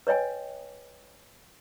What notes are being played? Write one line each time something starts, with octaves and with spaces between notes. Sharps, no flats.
B4 C#5 D#5 G5 G#5